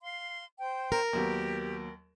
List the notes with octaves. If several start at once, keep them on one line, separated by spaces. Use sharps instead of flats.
F5 C6
C5 G5
A#4
D#2 F#3 B3 G4